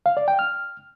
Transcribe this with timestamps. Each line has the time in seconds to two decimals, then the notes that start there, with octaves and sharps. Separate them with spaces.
0.06 F5
0.17 D5
0.28 G5
0.39 F6